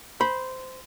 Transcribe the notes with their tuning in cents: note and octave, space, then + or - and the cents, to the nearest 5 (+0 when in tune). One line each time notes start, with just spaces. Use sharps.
C5 -15 B5 -15